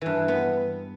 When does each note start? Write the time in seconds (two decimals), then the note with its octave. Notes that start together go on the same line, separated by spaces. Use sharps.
0.01 G2 E3
0.28 B3